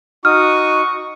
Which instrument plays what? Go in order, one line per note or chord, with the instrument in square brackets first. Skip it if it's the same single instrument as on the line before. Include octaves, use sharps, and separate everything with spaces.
[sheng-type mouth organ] D#4 F#4 D#6 [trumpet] C#6 [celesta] F6